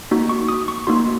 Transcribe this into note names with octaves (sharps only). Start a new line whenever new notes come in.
A#3 D#4 F#4
C#6
D#6
C#6
A#3 D#4 F#4 C6